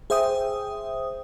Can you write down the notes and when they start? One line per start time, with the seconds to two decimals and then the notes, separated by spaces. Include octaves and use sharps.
0.10 G#4 C5 E5 G5 D#6